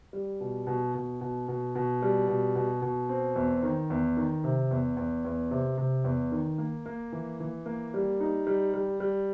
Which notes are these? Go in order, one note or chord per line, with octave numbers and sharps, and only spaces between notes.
G3
B2
B2
B2
B2
B2
B2
G3
B2
B2
B2
C4
E2
D#3
E2
D#3
C3
E2
E2
E2
C3
C3
E2
D#3
A#3
A#3
E3
E3
A#3
G3
D#4
G3
G3
G3